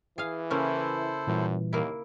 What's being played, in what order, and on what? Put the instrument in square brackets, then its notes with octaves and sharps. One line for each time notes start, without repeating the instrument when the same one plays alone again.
[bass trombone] E3 [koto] G#4 F5
[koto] C#3 A#3 C#4 [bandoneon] E4 A4 C5
[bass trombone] F#2 [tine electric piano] A#2 E3 G3
[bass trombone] D#2 [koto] A#3 E4